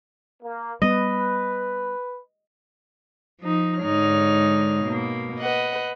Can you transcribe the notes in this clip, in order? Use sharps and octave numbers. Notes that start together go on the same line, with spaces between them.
A#3
G3 B3 B4 D#5
F3 D#4
G#2 D3 G#3 D#4 C#5 F6
B2 A#3
B4 D#5 F#5